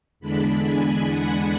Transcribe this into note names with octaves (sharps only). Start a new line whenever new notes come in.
E2 D3 G#3 D4 B5
G#5
F#5